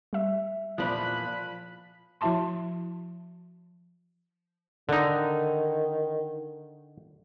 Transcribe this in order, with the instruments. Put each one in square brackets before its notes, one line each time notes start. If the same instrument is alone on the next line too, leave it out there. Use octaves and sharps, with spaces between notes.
[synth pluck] G3 E5
[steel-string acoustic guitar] E2 A#2 [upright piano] F3 [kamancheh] B5 F#6
[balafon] F3 E4 F#4 E5 A5 C6
[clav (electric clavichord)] D3 D#4 [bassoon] D#3